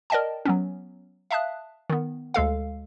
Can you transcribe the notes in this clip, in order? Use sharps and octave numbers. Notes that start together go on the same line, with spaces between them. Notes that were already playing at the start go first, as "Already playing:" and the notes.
A#4 D5 D#5 G5 A5
F#3 B3 C#4
E5 F5 A5 D#6 F#6
D#3 B3
D2 G#3 A4 F5